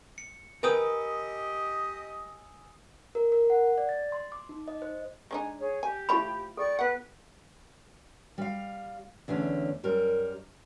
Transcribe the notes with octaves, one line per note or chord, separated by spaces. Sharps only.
C#7
G4 A#4 B4 D#5 G5 G#5 D#6 E6
A#4
A#4
F#5
D5
A6
C6
D6
D#4
D#5
C5
G#3 D4 D#4 G#5
G#4 C#5
G4 G#5
F3 A3 E4 F4 B5
A4 D5 G5 C#6
B3 B4 F#5 F#6
G3 F5
E2 D3 A3 C#4
F#2 G3 A#4